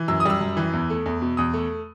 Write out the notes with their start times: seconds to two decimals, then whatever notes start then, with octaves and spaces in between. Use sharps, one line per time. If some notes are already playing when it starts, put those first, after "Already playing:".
Already playing: E3
0.08 F#2 E6
0.20 D#6
0.25 G3 E6
0.41 F#2
0.57 E3
0.73 E2
0.90 A3
1.06 E2
1.22 B2
1.37 E2 D#6
1.54 A3